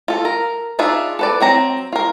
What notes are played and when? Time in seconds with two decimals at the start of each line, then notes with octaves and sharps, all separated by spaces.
0.08 F4 A4
0.25 A#4
0.79 D4 D#4 F4 G#4 E5
1.19 A4 B4 D5
1.41 F#3 C4 A#5
1.93 F4 A#4